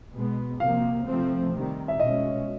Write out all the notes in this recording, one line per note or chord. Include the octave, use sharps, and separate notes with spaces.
B2 G#3 B3
C3 F3 A#3 F5
C3 F3 A3 C4
C3 D#3 G3
E5
B2 G#3 C#4 D#5